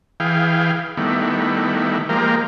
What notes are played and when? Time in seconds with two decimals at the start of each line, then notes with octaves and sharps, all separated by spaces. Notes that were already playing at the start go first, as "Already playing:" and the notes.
0.20 E3 G#4 F5 G5
0.97 D#3 G3 A3 B3 E4
2.09 F3 G#3 A#3 G4 A#4